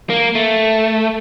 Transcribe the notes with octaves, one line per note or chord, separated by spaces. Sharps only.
A#3
A3